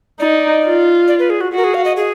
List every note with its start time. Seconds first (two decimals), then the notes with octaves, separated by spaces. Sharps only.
0.20 D#4 D5
0.65 F4
1.08 D5
1.19 B4
1.30 G#4
1.41 F#4
1.53 F#4 A#4
1.64 G#4
1.74 F5
1.85 D#5
1.96 G#4